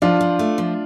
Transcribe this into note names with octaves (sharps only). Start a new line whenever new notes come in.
F3 D4 F4
F3
A3
F3